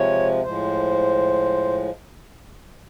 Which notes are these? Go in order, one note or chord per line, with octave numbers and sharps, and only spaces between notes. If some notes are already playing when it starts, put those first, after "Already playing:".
Already playing: C3 F3 G#3 C#5
A2 F3 G#3 C5